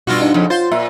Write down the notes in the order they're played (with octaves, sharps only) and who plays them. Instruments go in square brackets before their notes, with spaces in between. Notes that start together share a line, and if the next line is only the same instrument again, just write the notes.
[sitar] G2 F4 F#4 [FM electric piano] B2
[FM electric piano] D4 D#4
[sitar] F2 C#3
[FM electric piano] F4 A6 [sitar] C5
[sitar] A#2 [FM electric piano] E5